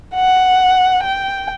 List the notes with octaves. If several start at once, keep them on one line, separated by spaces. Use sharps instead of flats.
F#5
G5